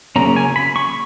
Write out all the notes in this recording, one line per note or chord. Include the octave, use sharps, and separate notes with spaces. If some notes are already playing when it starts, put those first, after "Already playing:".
C#3 F#3 A#3 C#4 A#5
G#5
B5
C#6